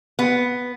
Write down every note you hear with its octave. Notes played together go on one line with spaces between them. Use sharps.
B3